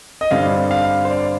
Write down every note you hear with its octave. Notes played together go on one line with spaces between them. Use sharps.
D#5
G2 D3 G3 C4 F5
F5
C5
D5